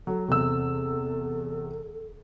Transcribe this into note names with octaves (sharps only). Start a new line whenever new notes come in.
F#3 A4
E2 C3 A4 E6